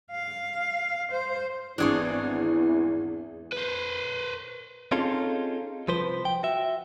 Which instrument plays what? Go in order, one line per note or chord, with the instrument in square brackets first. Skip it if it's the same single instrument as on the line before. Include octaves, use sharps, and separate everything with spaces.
[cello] F5
C5
[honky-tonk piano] G#1 E3 [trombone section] E2 [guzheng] D4 G#4 C#5
[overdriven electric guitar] B4 C5
[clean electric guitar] C4 C#4 D#4 F4 G#4 A4
C2 F3 B4 C5
G5
F#4 E5